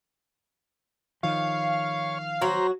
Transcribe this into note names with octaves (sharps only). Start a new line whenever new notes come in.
D#3 F3 C#5 F5
F#3 F#4 C5 A#5